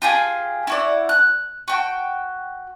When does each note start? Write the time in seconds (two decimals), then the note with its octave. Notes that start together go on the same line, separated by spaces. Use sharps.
0.02 F4 G4 G#4
0.67 E4 F#4 D5
1.09 F#6
1.68 F#4 G5